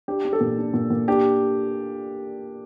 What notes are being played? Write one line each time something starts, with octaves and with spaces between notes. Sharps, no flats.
D4 G4
D4
A4
A#2
D4
A#2
A#2
D4 G4